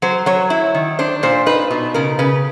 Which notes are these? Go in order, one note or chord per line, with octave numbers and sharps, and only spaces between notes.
F#3 C5
F#3 C#5
E4
D#3
D4 C5
A#2 C5
D#4 B4
B2
C#3 A#4
C#3 B4